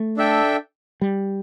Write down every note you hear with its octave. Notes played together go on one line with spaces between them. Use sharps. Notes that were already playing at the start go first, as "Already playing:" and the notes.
Already playing: A3
D4 A4 E5 G5
G3